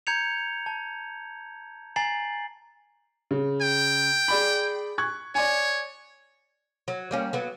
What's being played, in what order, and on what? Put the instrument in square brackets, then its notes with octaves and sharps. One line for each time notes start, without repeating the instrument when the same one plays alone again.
[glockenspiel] A#5 G6 G#6 C#7 F7
A5
G#5 A#5 A6 C7 F#7
[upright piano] C#3
[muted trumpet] G5
[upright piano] G#4 D5 B5
C#6 F#6 G#6
[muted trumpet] C#5 [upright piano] D5 G#5
[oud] F#3
G3 A#3 C#4
F#3 B3